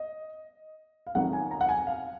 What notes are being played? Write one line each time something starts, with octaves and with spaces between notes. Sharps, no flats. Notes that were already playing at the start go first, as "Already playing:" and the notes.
Already playing: D#5
F5
F2 D#3 F#3 F#5
G#5
A#5
F#5
G#5
F5